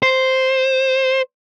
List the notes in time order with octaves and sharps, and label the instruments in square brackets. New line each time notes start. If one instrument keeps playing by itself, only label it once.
[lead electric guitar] C5